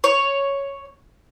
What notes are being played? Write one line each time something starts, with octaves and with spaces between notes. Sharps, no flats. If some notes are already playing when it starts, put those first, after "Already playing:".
C#5